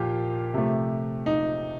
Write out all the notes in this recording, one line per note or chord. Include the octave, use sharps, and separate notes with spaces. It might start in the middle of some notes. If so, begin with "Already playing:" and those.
Already playing: A#2 F3 F4 G4
C3 F3 A3
D#4